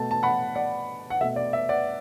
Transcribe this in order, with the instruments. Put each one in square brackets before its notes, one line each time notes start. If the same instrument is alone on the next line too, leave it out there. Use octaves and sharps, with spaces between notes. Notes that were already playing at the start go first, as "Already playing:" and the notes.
Already playing: [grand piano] B2 A3 A5
A5
F#5 B5
D5 F#5
F#5
B2 A3 E5
D5
E5
D5 F#5